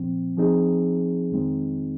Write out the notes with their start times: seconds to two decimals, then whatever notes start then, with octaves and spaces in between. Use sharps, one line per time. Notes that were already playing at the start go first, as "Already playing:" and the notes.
Already playing: A#2 F3 C4
0.37 F3 C4 D#4 G#4
1.31 F2 D#3 G#3 C4 D#4